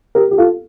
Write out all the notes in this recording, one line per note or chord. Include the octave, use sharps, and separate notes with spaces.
G4 A#4
G4
F4 A4